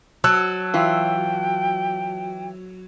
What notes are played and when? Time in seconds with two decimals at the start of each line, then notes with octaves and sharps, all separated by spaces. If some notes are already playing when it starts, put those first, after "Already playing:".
0.24 F#3 A5 E6 F#6
0.74 E3 F4 G5